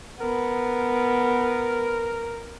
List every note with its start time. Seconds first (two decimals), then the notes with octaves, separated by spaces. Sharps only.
0.21 B3 A#4